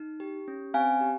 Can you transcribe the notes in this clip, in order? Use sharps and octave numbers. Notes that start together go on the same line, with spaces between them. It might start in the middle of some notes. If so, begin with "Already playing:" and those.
Already playing: D#4
G4
C#4
C4 F5 G#5
G4